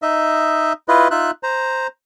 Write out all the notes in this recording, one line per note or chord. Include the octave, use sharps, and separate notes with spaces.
D#4 D#5 E5
E4 F4 B4 D#5
D#4 F4 E5 F#6
C5 A#5